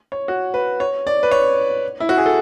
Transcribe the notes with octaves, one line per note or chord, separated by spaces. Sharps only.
C#5
F#4
B4
C#5
D5
B4
C#5
E4
F#4
G#4
A4